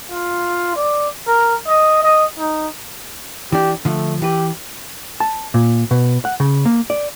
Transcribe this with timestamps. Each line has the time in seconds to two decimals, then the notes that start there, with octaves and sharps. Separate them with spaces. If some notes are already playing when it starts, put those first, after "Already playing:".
0.11 F4
0.76 D5
1.27 A#4
1.67 D#5
2.03 D#5
2.39 D#4
3.52 E3 D4 G4
3.85 D3 F3 A3
4.22 E3 G4 B4
5.20 A5
5.54 A#2
5.91 B2
6.25 F#5
6.40 C#3
6.65 A#3
6.90 D5